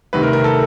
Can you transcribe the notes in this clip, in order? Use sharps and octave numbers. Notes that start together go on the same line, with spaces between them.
D2 C3 D#3 B4
A#4
A#4
A4